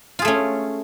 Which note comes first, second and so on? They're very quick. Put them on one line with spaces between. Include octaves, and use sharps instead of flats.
F4 G#4 A3 C#4